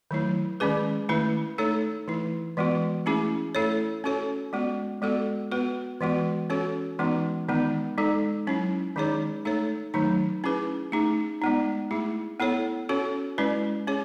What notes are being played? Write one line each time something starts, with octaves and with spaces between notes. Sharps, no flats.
D#3 F#3 A3 E4
D#3 G#3 C#4 G#4 B4
D#3 A3 E4 B4
A3 D#4 A4 C#5
E3 A3 E4
E3 G#3 B3 F#4
A3 C#4 E4 G#4
A3 E4 A4 C#5
C#4 F#4 A4 C#5
G#3 B3 F#4
G#3 B3 F#4 A4
B3 F#4 B4
E3 G#3 B3 F#4
C#4 F#4 A4 C#5
E3 G#3 B3 D#4 F#4
D#3 G#3 B3 D#4
G#3 D#4 A4
F#3 C#4 E4
D#3 G#3 D#4 G#4 C#5
A3 D#4 A4 C#5
D#3 F#3 A3 D#4
C#4 E4 G#4 B4
A3 D#4 G#4
G#3 B3 D#4
A3 E4 G#4
B3 E4 A4 C#5
C#4 F#4 A4 C#5
G#3 C#4 E4 B4
C#4 G#4 C#5